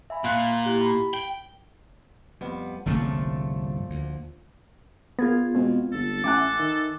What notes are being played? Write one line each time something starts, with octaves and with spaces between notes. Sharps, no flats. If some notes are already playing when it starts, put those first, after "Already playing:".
E5 G#5 B5
A#2 F5 F#5 F#6
E4 G4
B5
G5
F2 G3 B3
G1 C2 A#2 C#3 F3 A3
D2
B3 F4 G#4 A#4 G#6
B2 G#3 C4
G1 A4
A1 E5 F#5 G#5 D6 F#6
D#3